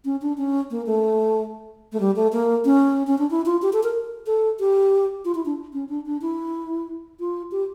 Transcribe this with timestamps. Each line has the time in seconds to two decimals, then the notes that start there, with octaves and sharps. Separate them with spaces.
0.05 C#4
0.22 D4
0.38 C#4
0.71 A#3
0.86 A3
1.92 A3
2.00 G3
2.16 A3
2.32 A#3
2.65 C#4
3.07 C#4
3.19 D4
3.30 E4
3.46 F4
3.62 G4
3.73 A4
3.83 A#4
4.27 A4
4.60 G4
5.25 F4
5.35 E4
5.46 D4
5.73 C#4
5.89 D4
6.06 D4
6.22 E4
7.20 F4
7.52 G4